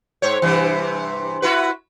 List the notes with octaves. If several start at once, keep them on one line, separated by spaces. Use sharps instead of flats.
G#2 C5 C#5
G2 C3 E3
E4 F#4 B4